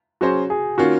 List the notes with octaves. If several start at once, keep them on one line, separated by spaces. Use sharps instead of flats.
F#3 C#4 F#4 G#4 C5
G#4
D#3 A#3 C#4 F4 F#4